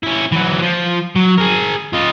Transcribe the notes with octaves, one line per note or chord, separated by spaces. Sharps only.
C#4 E4
E3 F#3
F3
F#3
G#4 A#4
F4 D#5